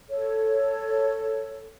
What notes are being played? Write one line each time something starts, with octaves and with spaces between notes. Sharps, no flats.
A4 C#5